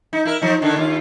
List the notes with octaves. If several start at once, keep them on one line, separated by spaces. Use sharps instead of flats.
D#4
E4 A#4
F3 D#4
D3 D#3 D4
D#2 F4